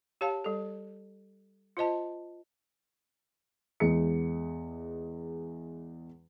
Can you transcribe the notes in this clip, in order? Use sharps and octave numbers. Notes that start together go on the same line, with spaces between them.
G4 C#5 F5 A5
G3 A4
F4 C5 D#5 A5
E2 G#3 C#7